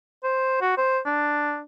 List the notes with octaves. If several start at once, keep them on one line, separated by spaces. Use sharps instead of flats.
C5
F#4
C5
D4